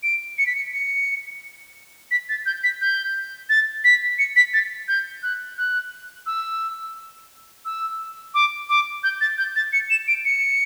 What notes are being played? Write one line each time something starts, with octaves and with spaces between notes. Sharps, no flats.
D7
C#7
B6
C#7
C#7
B6
A6
G6
B6
G6
A6
B6
C#7
B6
A6
G6
F#6
F#6
E6
E6
D6
D6
G6
A6
G6
A6
C#7
E7
D7
C#7